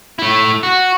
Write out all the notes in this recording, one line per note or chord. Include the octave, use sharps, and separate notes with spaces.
A3 E4
F#4